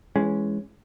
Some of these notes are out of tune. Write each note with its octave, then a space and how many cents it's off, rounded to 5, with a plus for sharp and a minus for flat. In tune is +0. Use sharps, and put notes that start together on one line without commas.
E3 +15 G#3 +0 C#4 +0